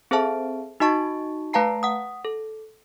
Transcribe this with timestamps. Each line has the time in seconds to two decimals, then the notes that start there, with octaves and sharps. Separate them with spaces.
0.11 C4 G#4 A4 C5 E5 A5
0.80 D#4 F#4 D#5 A5 C#6 A6
1.53 A3 B4 F5 A5 A#5 C7
1.83 F#5 D#6
2.25 A4